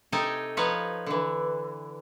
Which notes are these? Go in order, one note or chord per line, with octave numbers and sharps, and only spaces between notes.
C3 D#4 A4 D#5 G5 G#5
F3 D#4 B4 C#5 F5
D3 E3